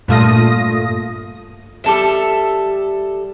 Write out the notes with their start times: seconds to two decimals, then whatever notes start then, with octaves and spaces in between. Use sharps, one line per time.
0.08 G2 A#2 A3 F4 D#6 A#6
1.84 G3 A4 E5